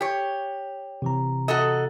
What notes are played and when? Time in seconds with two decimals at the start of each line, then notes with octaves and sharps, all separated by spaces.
0.01 G4 C#5
1.02 C3 E3 A#5
1.48 F#4 A4 D#5